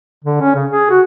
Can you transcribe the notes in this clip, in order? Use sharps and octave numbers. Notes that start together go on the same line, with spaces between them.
D3
C#4
C#3
G#4
F#4